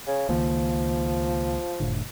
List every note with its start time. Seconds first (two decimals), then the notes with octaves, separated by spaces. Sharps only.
0.07 C#3
0.29 C#2 D#3 F3 A#3
1.80 F1 A2 D3